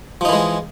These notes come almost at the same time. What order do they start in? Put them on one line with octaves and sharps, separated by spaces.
F3 D#4 E3 G#3